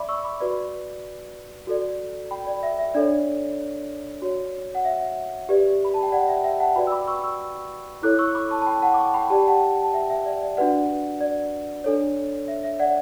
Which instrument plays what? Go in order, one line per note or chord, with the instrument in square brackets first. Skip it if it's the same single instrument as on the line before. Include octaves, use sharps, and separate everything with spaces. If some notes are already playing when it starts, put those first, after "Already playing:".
Already playing: [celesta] D5 E5 B5 D6
C#6 E6
B5 D6
F#4 B4 D5
F#4 A4 D5
G5 B5
D5
E5
E5
D4 A4 C#5 D5
F#4 C#5
F#5
E5
G4 B4 D5
B5
A5
G5
D5 F#5
E5 G5
E5 G5
F#5 A5
F#4 B4 D5 G5 B5
E6
B5 D6
C#6 E6
C#6 E6
E4 A4 C#5 D6 F#6
C#6 E6
B5 D6
A5 C#6
A5
G5 B5
F#5 A5
D6
A5 C#6
G5 B5
G4 D5 A5
G5
F#5 A5
A5
E5 G5
E5
D5
D5
D4 F#4 B4 D5 F#5
D5
D4 A4 C#5
E5
E5
D5 F#5